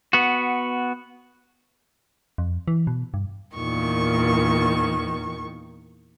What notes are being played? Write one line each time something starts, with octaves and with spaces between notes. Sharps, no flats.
B3 F#4
F2
E3
B2
G2
E2 A#2 D#3 C#6